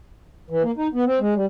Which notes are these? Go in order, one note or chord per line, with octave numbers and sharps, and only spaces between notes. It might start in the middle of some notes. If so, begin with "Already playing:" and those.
E3
A#3
D#4
B3
C4
G#3
G3